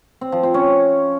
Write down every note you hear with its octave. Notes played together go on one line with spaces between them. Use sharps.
C4
F3
C4
C#4